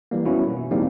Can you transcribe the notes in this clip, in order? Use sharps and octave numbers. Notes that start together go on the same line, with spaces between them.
E3 G3 A#3
F#2 B3 C#4 E4 F#4
B2
E2 A2 G3 A#3 C4 D#4